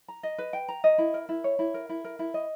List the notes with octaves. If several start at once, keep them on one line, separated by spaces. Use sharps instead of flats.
A#5
D#5
B4
G5
A#5
D#5
E4
A#4
E4
C#5
E4
A#4
E4
A#4
E4
D#5